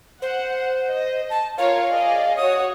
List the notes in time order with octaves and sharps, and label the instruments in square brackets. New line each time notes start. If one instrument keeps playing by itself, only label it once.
[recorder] C5 [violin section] F#5
[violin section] D#5
[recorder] A5
[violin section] F4 A#4 C#5 [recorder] F5
[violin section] G#4 D5 D#5
[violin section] F#4 C#5 [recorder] D#6